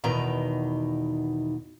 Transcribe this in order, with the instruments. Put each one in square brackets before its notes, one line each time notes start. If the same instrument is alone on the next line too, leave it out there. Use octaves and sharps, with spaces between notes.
[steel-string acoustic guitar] E2 B2 D#3 A#5